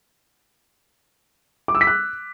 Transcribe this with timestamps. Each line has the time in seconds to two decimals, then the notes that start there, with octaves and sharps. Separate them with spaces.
1.68 D6
1.75 E6
1.81 B6
1.87 F#6